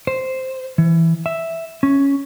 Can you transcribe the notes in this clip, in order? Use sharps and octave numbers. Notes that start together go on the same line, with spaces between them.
C5
E3
E5
C#4